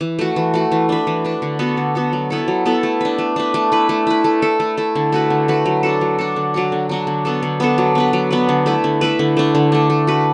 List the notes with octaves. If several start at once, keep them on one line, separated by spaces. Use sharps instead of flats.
E3
A3 F#4
E3
A3 F#4
E3
D4 B4
E3
D4 B4
D3
B3 F#4 A4
D3
B3 F#4 A4
F#3
B3 E4 A4
F#3
B3 E4 A4
A3
D4 B4
A3
D4 B4
A3
E4 B4
A3
E4 B4
A3
E4 A4
A3
E4 A4
D3
A3 F#4 B4
D3
A3 F#4 B4
F#3
D4 F#4 A4
F#3
D4 F#4 A4
D3
F#3 D4 F#4
D3
F#3 D4 F#4
D3
B3 D4 A4
D3
B3 D4 A4
F#3
B3 D4 B4
F#3
B3 D4 B4
D3
A3 E4 B4
D3
A3 E4 B4
D3
A3 D4
D3
A3 D4
A3
F#4 B4